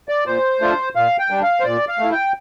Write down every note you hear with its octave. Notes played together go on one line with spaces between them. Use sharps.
D5
A#2 C5
A3 D4 F4
A#2 F5
G5
G3 D4
F5
C5
A#2 D5
F5
A3 E4
G5